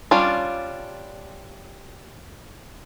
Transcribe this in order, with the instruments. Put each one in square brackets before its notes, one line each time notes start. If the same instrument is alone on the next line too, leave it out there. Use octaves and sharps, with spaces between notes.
[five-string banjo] G3 C#4 D4 F4